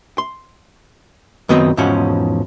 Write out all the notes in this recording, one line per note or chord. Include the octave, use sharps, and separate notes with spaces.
C6
F#2 D#3 B3 C4 B4 D#5
E2 G#2 B2 F3 C#4 F#5